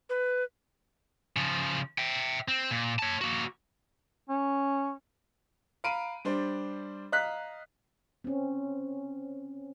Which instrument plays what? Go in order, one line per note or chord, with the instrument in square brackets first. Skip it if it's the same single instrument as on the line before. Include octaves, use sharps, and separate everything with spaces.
[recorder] B4
[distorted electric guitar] C#3 F3
E5 G5
C4
A#2
C#5 A5
A#3 F#4
[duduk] C#4
[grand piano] F5 A#5 B5 D7 D#7
G3 D4 C5
D#5 F5 A#5 F#6 B6
[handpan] C4 C#4